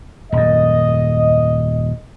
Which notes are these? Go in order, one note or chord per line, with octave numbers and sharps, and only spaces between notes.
D#1 F#2 D#5